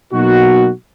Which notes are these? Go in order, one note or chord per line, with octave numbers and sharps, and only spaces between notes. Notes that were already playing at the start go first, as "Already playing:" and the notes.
B2 F#3 A#3 D#4 F#4